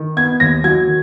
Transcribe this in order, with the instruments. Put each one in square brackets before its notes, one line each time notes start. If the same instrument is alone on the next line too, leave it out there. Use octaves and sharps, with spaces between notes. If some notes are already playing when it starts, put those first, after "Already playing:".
Already playing: [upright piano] D#3
B3 G#6
D#2 A#6
F#3 G#6
D#3